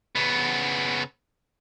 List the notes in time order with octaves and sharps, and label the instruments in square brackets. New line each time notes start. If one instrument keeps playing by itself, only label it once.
[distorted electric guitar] C#3 B3